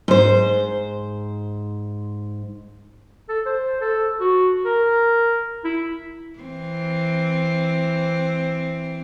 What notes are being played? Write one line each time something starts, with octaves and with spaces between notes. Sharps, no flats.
G#2 C5
A4
C5
A4
F#4
A#4
E4
E3 C4